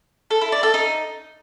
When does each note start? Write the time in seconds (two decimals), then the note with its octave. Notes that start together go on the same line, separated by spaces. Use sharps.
0.31 A4
0.41 E4
0.52 D5
0.63 A4
0.74 D#4